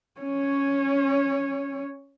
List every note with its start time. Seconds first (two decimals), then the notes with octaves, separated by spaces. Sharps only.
0.21 C#4 C#5